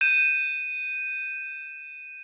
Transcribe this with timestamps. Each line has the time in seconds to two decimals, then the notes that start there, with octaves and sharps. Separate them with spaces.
0.01 G6 D#7 E7